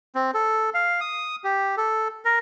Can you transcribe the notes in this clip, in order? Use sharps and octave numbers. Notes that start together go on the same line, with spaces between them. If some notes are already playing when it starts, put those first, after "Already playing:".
C4
A4
F5
D#6
G4
A4
A#4